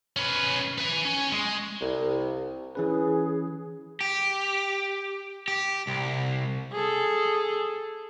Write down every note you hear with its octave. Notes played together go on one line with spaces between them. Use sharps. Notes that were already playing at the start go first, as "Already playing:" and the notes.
C#4 B4
B4 G#5
C#4
G#3
C2
E3 C#4 G#4 B4
G4
G4
C2
G#4 A4